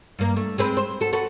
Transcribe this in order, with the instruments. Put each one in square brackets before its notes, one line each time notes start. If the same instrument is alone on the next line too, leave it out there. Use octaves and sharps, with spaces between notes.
[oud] G2 A#3
A3
G#3 C4 B4
C5
F#4 A4
F#4 A4 B4